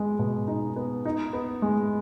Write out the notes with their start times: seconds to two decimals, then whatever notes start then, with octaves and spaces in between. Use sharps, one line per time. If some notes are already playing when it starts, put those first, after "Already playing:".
Already playing: G#3 B3
0.19 B2
0.48 D#4
0.76 B3
1.05 D#4
1.33 B3
1.62 G#3